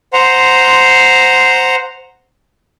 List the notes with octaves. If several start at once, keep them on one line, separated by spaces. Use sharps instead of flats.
C5 F#5 A#5 C6